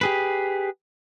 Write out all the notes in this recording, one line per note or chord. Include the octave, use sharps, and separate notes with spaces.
G4 G#4 B4